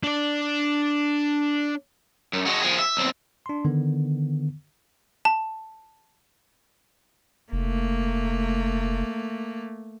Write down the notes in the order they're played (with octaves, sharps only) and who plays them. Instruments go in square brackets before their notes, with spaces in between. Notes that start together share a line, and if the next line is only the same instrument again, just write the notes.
[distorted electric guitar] D4 D5
[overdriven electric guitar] F#2
G#3 F#4
F3 G#4
E5
B1 C4
[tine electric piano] D4 C6
D3 D#3 B3
[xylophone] A5
[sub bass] F1 [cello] A3 A#3